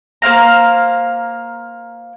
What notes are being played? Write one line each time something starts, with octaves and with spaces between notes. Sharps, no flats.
A#3 C5 F5 A#5